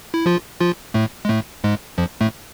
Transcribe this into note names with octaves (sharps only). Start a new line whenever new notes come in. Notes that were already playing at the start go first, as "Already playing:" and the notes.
E4
F3 F4
F3 F4
A2 A3
G#3
A2 A3
G#2 G#3
F2 F3
A2 A3